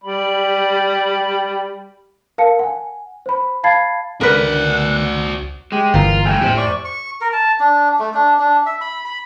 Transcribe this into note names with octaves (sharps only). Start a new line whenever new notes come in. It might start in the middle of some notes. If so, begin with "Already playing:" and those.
G3 D5 B5
A#4 F5 A5 C#7
F#5 G#5
C5 B5
F5 A5 B5 G#6 A6 C7
C#2 D3 F#4 A#4 B4 D5 F#5
G#3 G4
G1 E3 F4 A#4
G2 A3 G5 G#5
F2 A2 G4 C5
D5 C#6
C#6
A#4
A5
D4
A3
D4
D4
E5
B5
B5